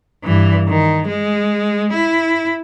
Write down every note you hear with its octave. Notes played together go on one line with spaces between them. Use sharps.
G2 E3
D#3
G#3
E4